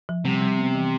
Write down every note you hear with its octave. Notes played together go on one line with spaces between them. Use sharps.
F3
C3 G3
G3
B3
E3